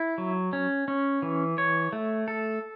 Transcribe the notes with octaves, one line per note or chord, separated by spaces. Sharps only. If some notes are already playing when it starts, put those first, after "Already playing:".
Already playing: E4
F#3
C#4
C#4
E3
C#5
A3
A4